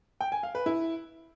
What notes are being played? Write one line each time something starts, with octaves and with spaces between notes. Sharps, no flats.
G5
G#5
F5
B4
E4